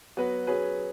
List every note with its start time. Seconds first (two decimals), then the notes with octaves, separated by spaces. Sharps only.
0.17 F#3 B3 F#4 B4
0.47 F#3 C#4 G#4 B4